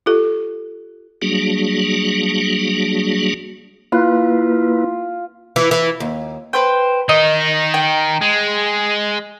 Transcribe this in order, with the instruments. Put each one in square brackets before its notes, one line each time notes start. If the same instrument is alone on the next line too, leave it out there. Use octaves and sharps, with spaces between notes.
[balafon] F4 G4 A4
[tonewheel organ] F#3 G3 A#3 D4 F#4 G#4
[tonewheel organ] A#3 E4 B4 [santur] F4
[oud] E3
E3
D#2
[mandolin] B4 C5 G5
[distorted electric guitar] D#3 D#4 [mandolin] D#5
[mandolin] G5
[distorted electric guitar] G#3